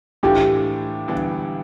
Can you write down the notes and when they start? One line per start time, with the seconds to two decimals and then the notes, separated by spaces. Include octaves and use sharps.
0.23 A2 E3 A3 D4 F4 G4
1.08 G1 G2 E3 B3 D4